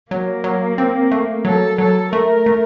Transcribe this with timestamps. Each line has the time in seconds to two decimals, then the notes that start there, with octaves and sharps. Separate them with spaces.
0.10 F#3 A#3
0.44 F#3
0.78 C4
1.12 A3
1.45 F#3 A4
1.78 F#3 A4
2.13 A3 A#4
2.46 A3